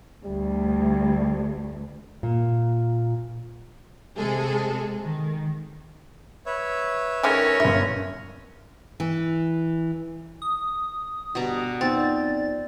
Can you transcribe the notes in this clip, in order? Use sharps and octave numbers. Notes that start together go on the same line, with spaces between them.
D2 G3
A#2
C3 G#3 G#4 A4
D#3
B4 C#5 E5
D3 D#3 G#3 C#4 A#4
G1 G2 E5
E3
D#6
G1 B2 D4 G4 D5 A#5
F2 B3 C4 D#4 D5 A6